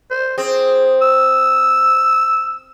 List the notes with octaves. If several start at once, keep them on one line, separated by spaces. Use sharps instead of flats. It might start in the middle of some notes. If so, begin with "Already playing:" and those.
C5
C4 G#4
E6